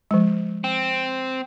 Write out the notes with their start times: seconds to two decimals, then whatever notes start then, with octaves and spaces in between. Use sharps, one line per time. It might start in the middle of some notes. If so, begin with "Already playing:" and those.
0.11 F3 G#3
0.64 C4